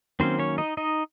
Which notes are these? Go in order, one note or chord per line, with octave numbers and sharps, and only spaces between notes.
D#3 F#3 A#3 C4 C#4 C5
C#4 C#5
D#4 D#5
D#4 D#5